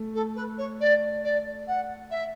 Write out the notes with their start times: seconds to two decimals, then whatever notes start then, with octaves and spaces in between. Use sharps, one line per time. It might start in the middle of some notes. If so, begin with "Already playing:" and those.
Already playing: A3
0.14 A4
0.35 B4
0.58 C#5
0.80 D5
1.23 D5
1.67 F#5
2.10 E5